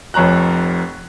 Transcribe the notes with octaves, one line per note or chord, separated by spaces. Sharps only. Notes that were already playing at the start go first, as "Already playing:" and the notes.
F1 F2 C#5 A#5 F#6